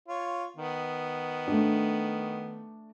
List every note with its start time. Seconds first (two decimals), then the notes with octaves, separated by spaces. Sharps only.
0.08 F4 C#5
0.57 D#3 B3
1.47 A3 D4